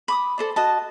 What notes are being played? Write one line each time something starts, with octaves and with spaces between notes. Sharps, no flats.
B5 D6 D#6
A4 C5 D5
F#4 D#5 A5